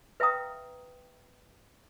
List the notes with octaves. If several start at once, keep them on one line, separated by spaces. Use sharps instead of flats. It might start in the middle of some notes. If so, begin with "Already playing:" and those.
B4 E5 F5 G5 A#5 D#6